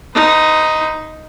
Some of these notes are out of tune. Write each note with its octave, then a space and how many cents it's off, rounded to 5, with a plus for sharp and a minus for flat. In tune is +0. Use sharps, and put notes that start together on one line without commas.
D#4 +5 B4 +45